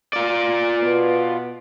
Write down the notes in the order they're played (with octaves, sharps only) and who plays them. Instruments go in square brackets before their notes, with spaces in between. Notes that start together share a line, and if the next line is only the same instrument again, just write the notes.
[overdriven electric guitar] F4 D5
[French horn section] B2 B3 B4